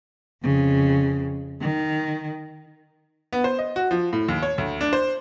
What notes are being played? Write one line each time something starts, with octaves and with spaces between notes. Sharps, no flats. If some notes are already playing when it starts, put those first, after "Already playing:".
F2 C#3
D#3
B3
C5
D#5
F#4
F3
A2
D#2
C#5
D2
D4
C5